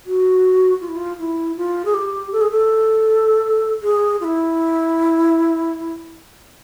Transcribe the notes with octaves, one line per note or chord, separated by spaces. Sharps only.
F#4
F4
E4
F4
E4
F4
G#4
G4
A4
G#4
A4
G#4
F4
E4